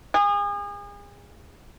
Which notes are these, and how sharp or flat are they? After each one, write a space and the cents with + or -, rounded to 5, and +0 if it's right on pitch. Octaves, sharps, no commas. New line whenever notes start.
G#4 -35